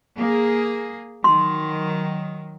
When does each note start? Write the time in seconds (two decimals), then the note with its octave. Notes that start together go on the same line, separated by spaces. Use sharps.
0.18 A#3 G#4
1.24 D#3 F#3 C6